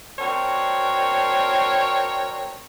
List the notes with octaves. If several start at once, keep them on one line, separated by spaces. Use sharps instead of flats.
C4 D4 F#4 A#4 C#5